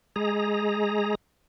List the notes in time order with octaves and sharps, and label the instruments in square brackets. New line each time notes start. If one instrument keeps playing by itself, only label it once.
[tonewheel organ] G#3 G#4 A#5